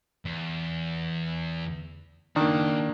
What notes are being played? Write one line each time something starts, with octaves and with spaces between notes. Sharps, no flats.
E2
D#3 A#3 D4 F#4 A5